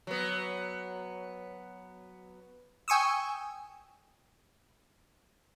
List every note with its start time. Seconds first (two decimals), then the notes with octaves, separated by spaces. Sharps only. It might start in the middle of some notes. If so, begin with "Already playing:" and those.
0.07 F#3 B3
2.88 G5 G#5 C#6 D#6 E6